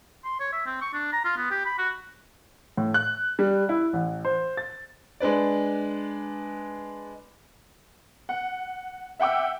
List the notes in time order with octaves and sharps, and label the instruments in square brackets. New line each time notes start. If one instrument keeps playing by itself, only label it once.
[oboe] C6
C#5
E5
C4
C#6
D4
A#5
F4
B3
G4
B5
F#4
[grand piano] A2
F#6
G3
E4
A1
C5
A6
G#3 D4 B4 D5
[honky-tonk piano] F#5
E5 F#5 G5 D6 E6